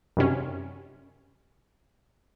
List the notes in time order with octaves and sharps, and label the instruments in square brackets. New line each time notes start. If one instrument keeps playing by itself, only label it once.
[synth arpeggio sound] F#2 C3 C#4